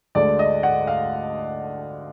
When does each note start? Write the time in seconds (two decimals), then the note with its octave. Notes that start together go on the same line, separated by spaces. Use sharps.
0.15 D2 D3 G#3 D5
0.39 D#5
0.63 F#5
0.87 F5